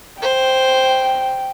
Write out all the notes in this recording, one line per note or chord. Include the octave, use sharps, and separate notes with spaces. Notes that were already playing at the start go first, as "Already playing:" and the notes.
C5 G5